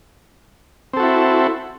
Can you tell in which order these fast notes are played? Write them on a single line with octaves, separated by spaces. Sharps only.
C4 A4 F#4 E4